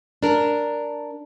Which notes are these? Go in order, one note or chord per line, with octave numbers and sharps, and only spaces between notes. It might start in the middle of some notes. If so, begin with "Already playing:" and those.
D4 A#4